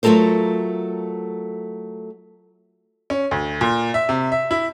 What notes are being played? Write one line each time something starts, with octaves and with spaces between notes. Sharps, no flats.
F#3 A3 F4 A4 A#4 C5
C#4
D2
A#2
E5
C3
E5
E4